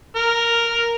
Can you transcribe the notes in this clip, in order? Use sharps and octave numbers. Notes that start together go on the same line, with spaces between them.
A#4